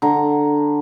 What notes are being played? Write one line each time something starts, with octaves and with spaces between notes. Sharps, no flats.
D3 A#5